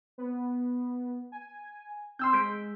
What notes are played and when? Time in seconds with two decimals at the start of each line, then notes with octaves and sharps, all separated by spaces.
0.18 B3
1.32 G#5
2.19 C4 C6 E6 G6
2.33 G#3 G6 B6 D7